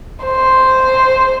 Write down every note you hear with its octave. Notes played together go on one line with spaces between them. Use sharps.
C5